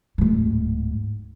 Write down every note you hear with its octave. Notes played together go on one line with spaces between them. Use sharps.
D1 G#2